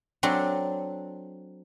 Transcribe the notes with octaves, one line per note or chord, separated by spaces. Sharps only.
F#3 C4 D4 A4